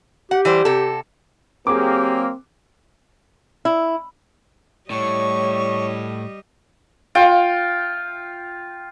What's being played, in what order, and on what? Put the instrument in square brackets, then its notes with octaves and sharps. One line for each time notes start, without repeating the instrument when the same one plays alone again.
[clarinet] G4 [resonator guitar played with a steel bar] F#5
[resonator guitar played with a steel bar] E3 G3 C5
C3 A4
[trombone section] F#3 A#3 [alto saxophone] C4 [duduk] G4 [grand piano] G#4 D6
[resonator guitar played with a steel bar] E4
[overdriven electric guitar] A2 [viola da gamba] G3 D#5 [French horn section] C#5 [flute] C#6
[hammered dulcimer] F4 G5